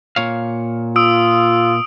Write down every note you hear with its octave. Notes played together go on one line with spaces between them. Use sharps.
A#2 C#5 F5
F4 D#6 E6 D7